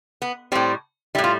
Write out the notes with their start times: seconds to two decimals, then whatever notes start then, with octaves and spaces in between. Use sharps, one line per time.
0.22 B3
0.52 A2 G3 C4
1.15 G3 E4
1.18 A2
1.24 F4